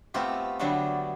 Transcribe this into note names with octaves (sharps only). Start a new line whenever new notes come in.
A3 B3 C4 F4 G4
D3 F#3 G3 A3 B3 D4